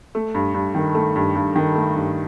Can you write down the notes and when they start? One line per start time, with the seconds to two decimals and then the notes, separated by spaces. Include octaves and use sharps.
0.15 A3
0.34 G2
0.54 G2
0.75 D#3
0.95 A3
1.15 G2
1.35 G2
1.56 D#3
1.75 A3
1.95 G2